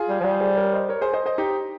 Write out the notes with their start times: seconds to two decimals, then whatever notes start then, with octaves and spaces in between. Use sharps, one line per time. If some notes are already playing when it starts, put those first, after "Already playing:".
Already playing: F4 G#4
0.08 G3
0.20 F3
0.24 G3
0.40 G#4 C5
0.56 A#4 C#5
0.73 C5 D#5
0.89 A#4 C#5
1.01 G#4 C5
1.13 C5 D#5
1.26 C5 D#5
1.38 D#4 G4